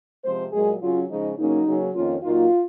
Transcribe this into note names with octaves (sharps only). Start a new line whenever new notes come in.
C3 F3 G#3 C4 C5
A#2 F#3 G#3 A#3 G#4
C#3 F#3 C#4 F4
C#3 F3 G#3 D#4
C#3 F#3 A#3 C#4 D#4
C#3 F#3 A#3 C#4
F2 D#3 A#3 C#4 F4
A#2 F#3 A#3 D#4 F4